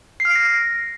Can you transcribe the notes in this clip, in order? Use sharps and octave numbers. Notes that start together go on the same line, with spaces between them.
C7
F6
D7
A#6